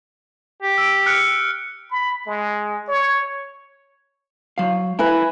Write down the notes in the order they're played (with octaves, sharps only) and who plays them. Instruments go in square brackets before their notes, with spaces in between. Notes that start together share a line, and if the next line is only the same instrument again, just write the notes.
[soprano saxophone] G4
[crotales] E6 D7
F6 F#6 C#7
[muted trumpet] B5
G#3
C#5
[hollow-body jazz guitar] F#3 F5
[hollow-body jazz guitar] E4 [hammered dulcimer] B4 G#5 A#5